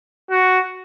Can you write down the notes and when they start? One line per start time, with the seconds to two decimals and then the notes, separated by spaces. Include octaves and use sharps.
0.31 F#4